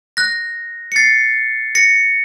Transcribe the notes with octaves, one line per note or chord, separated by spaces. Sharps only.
F#6 A#6
C#7
A6 C7
A#6 C#7